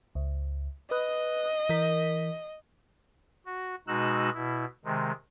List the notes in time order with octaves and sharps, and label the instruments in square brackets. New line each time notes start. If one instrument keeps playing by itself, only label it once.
[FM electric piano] C#2
[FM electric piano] B4 D#6 F#6 [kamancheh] D#5
[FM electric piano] E3 A#4 B6
[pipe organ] F#4
B2 G#3 D#4 F#4 E6 F#6
B2 E4
C3 D#3 G#3